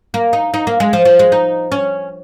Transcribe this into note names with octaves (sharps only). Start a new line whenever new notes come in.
A#3
D#4
D#4
A#3
G#3
F3
F3
G#3
D#4
C#4